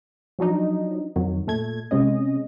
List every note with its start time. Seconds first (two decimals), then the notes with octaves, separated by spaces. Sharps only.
0.39 F3 F#3 D4 D#4
1.16 F2 D#3 F#3
1.47 A#2 A3 G#6
1.91 C3 G#3 C#4 D#5